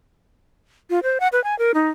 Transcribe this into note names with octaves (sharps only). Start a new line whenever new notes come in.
F4
C5
F#5
B4
G#5
A#4
D#4